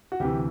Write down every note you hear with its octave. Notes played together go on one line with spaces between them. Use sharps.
F#4
D2 C3 E3 G4